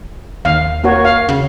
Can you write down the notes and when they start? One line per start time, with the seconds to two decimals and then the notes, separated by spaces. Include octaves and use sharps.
0.45 D#2 F5
0.84 A#3 F#4 C#5
1.05 F5
1.29 C#3